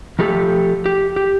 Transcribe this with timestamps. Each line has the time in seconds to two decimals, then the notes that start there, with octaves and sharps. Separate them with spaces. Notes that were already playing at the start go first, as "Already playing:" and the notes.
0.19 F3 A3 G4 A4
0.86 G4
1.16 G4